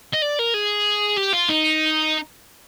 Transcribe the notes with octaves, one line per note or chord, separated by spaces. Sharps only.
D#5
D5
A#4
G#4
G4
F4
D#4